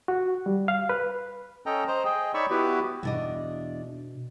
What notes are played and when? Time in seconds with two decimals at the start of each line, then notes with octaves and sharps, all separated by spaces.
0.08 F#4
0.46 G3
0.68 F5
0.89 B4
1.66 C#4 A4 D#5 G5 A#5
1.88 C5 D#5 A#5
2.05 G#4 D#5 G5
2.34 D#4 C#5 D5 B5 C#6 E6
2.50 B3 E4 F#4 G4 B4
3.03 E2 B2 D4 D#5